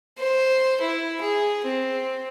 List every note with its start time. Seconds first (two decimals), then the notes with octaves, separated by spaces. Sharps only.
0.19 C5
0.81 E4
1.21 G#4
1.65 C4